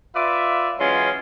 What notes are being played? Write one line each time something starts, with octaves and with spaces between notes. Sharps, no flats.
F4 B4 D5 E5
E3 F#3 G#3 C#4 F4